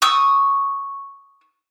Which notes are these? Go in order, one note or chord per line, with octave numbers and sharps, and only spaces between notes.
C#6 D#6 E6